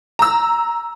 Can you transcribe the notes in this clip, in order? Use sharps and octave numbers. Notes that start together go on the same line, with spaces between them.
A#5 E6